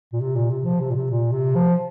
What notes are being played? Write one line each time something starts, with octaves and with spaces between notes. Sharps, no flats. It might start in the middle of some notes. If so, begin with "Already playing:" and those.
A#2
C3
A#2
C3
F3
C3
A#2
C3
A#2
C3
F3